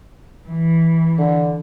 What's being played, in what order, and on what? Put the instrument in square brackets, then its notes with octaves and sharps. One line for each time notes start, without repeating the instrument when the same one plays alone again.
[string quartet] E3
[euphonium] D3